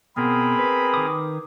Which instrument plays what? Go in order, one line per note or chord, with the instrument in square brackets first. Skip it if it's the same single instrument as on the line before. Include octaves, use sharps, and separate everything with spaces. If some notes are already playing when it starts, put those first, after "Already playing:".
[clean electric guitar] B2 [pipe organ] C4 G#4 A#4 [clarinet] B5
[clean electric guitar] B4
[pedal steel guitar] D#3 D6 D#6